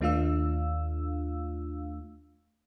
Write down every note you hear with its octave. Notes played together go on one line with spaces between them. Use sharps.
D#2 A3 D4 F4 F5 E6